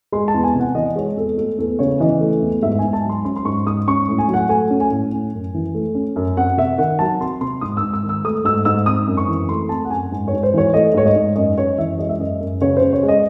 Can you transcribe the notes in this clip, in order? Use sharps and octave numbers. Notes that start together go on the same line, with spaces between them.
G#3 C6
A5
E2
G#5
C3
F#5
E3 D#5
G#3 C#5
E2 A4
A3 A4
E2 A4
C#3 C#5
E3 D#5
A3
E2
G#2 E5
G#2 G#5
A5
F#3 C6
C#4 C6
C6
G#2 C#6
G#2 D#6
C#4 C#6
A2
G#5
F#3
F#5
A3 G#5
C#4
G#5
A2
C#4
F#2
E3
A3
C#4
F#2
C4 F#5
C3 E5
D#3 F#5
F#3 A5
C4 C6
C3 C6
G#2 D#6
E6
G#2
E6
D#3
E6
A3 D#6
G#2 E6
G#2 E6
C4 D#6
F#2
C#6
E3
A3 C6
C4 A5
F#5
F#2 G#5
G#2
C#5
G#2
C5
E3 C#5
A3 D#5
G#2 C#5
D#5
G#2
F#2 D#5
F#2 C#5
E3 E5
G#3 D#5
E5
F#2 D#5
F#2
C#3 C#5
C#3 C5
C#5
G#3
D#5